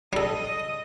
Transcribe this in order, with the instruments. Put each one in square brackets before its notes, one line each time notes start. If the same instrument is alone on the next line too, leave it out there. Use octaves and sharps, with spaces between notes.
[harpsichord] G3 A4 [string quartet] D#5 D#6